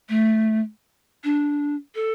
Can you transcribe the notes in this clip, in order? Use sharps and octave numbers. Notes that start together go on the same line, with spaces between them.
A3
D4
A4